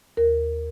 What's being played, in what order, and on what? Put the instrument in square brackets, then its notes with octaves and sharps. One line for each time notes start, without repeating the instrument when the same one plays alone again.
[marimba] D#2 A#4